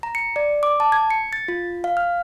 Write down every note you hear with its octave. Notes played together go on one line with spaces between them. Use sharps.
A#5
C#7
D5
D6
A5
G#6
C#7
A6
F4
F5
F6